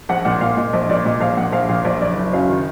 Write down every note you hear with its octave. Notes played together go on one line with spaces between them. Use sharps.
A#1 F#5
A#2 F#5
A#2 F5
A#2 D#5
A#1 D#5
A#2 D5
A#2 D#5
A#1 F5
A#2 F#5
A#1 F5
A#2 F5
A#1 D5
F#1 D5
F#1
F#2 F5
D#3